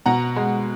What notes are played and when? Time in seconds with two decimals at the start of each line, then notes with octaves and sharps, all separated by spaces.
0.06 B2 F#5 A#5
0.36 G#3